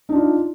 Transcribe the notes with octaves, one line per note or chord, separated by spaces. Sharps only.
D4 D#4 F4